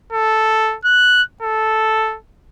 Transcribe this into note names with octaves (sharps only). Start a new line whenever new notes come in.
A4
F#6
A4